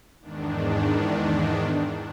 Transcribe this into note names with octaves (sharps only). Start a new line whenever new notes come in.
E2 G#2 D#3 D4